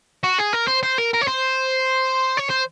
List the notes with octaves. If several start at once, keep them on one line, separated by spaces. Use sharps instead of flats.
F#4
G#4
A#4
C5
C5
A#4
A#4
C#5
C5
C#5
C5